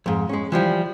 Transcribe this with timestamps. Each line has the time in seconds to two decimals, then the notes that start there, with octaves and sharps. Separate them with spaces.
0.06 F2 G#2
0.29 G#3 C#4
0.52 E3 F3 G3